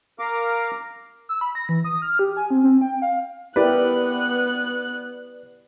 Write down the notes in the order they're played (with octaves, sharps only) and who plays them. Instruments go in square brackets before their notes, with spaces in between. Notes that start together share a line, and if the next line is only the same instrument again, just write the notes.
[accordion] A#4 F5 A#5 D6
[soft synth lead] E6
B5
A#6
E3
D#6
F6
G4
G#5
C4
C4
G5
F5
[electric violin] B3 F#6 [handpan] E4 G4 A#4 [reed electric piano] B4 D5